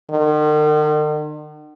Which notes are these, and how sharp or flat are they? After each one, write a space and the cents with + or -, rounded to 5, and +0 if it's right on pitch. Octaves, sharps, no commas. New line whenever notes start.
D#3 -45